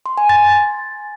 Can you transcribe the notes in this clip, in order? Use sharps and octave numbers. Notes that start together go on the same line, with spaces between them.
C6
G#5
A6